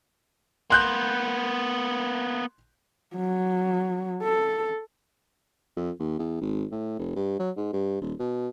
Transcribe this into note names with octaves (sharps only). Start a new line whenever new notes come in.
A#3 B3 C6 F#6 G6
F#3
A4
F2
D#2
E2
G#1
A2
F1
G2
F#3
G#2
G2
D#1
B2